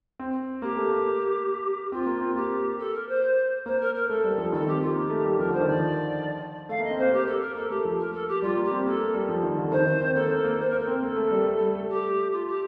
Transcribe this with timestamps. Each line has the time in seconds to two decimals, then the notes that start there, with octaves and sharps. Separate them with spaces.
0.19 C4
0.62 A#3 G4
0.77 A3
0.91 A#3
1.92 C4 F4
2.06 A#3
2.21 C4
2.36 A#3 G4
2.79 A4
2.94 A#4
3.08 C5
3.66 A#3 C5
3.80 A#4
3.95 A#4
4.09 A3 A4
4.24 G3
4.38 F3
4.52 D#3 A4
4.67 C4 G4
4.81 F4
4.95 A#3 G4
5.10 A3
5.24 G3
5.39 F3 A#4
5.49 D3 C5
5.61 D#3
5.69 F3 D5
6.69 A3 F5
6.80 A#3 D#5
6.91 C4
6.98 A#3 C5
7.13 G4
7.26 A4
7.41 A#4
7.55 A#3 A4
7.69 A3 G4
7.85 F3
7.99 A#4
8.13 A4
8.28 G4
8.42 G3 F4
8.57 A#3
8.64 G4
8.71 C4
8.86 A#3 A4
9.00 A3
9.14 G3
9.29 F3
9.43 D#3
9.58 D3
9.72 D#3 C5
9.87 D#3
10.02 C4
10.15 A#3 A4
10.30 A#3
10.44 A#3
10.59 C5
10.69 A#3 A#4
10.79 A4
10.87 C4 A#4
11.02 A#3 A4
11.16 A3
11.31 G3
11.46 A3
11.61 G3
11.75 A3
11.89 G4
12.32 F4
12.47 G4